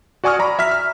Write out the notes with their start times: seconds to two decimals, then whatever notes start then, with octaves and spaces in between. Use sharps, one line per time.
0.24 F#4 D5 G#5 C#6 D#6 F6
0.39 D5 A#5 B5
0.59 E5 F6 B6
0.71 F6